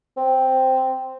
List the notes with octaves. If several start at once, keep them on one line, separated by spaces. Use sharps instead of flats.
C4